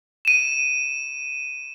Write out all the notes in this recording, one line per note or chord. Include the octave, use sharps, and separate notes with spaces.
D#7 E7